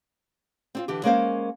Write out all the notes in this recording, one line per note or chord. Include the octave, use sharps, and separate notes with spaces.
C4 D4 F4
D3 E3 G4
G#3 A#3 C#4 A#4 C5 F5